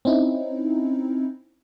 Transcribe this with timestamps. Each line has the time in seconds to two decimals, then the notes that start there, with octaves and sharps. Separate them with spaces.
0.05 C4 C#4 D#4 E4